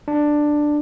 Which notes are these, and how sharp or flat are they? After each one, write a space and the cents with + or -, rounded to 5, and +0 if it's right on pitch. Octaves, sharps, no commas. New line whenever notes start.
D4 +10